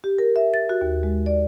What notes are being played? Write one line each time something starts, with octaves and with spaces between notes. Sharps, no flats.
G4
A#4
E5
A6
F#4
D#2
G#3
D5